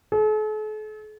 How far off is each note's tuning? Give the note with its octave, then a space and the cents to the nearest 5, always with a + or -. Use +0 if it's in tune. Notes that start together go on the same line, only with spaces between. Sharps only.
A4 -45